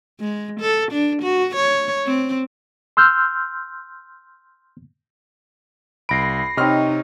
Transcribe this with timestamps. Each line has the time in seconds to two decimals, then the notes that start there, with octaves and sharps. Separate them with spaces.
0.20 G#3
0.60 A4
0.92 D4
1.22 F#4
1.56 C#5
2.07 C4
2.97 C6 E6 F6 G6
6.09 C2 B5 A#6 C7 D7
6.57 C3 C4 D#4 C#5 D#5 F6